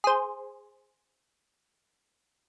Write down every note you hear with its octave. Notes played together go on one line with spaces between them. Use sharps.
G#4 C5